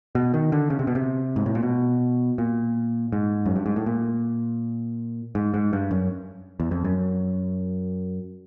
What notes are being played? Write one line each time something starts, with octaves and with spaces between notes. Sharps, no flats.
B2
D#3
D3
C#3
C3
B2
C3
G#2
A2
A#2
B2
A#2
G#2
F#2
G2
G#2
A2
A#2
G#2
G#2
G2
F#2
E2
F2
F#2